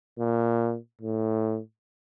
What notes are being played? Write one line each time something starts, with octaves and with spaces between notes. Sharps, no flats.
A#2
A2